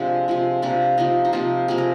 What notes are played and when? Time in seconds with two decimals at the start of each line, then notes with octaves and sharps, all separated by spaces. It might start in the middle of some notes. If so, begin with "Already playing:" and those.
Already playing: C3 F3 G#3 A#3 D4 C5
0.28 C3 F3 G#3
0.62 C3 F3 A#3 D4
0.98 C3 F3 A#3 D#4
1.25 D#4
1.33 C3 F3 A#3 F4
1.68 C3 F3 A#3 G#4
1.78 A#4